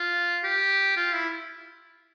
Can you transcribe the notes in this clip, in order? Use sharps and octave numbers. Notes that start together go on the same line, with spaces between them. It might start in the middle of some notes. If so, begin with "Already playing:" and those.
Already playing: F4
G4
F4
E4